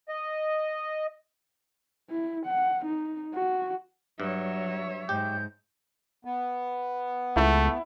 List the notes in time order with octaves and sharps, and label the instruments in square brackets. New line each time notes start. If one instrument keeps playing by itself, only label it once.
[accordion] D#5
[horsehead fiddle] E4
F#5
D#4
F#4
[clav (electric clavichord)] G2 [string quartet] F#3 [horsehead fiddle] C#5 E5
[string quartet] G#2 [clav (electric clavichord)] G4 [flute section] G6
[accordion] B3
[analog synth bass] C#2 [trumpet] A3 [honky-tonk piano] E4